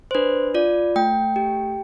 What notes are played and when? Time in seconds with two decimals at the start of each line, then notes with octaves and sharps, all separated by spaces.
0.11 C5
0.15 D4 B4
0.54 F4 D5
0.96 A3 G5
1.36 G4